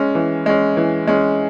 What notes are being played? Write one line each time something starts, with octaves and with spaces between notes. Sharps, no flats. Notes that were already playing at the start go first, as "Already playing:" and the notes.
Already playing: G#3 C#4
E3
G#3 C#4
E3
G#3 C#4